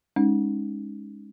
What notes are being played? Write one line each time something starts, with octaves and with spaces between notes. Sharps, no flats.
G#3 C#4 D#4